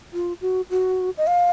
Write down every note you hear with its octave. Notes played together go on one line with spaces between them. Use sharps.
F4
F#4
F#4
D#5
F5